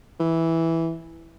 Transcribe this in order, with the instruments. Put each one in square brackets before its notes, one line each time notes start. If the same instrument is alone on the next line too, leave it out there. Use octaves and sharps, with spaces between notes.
[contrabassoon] E3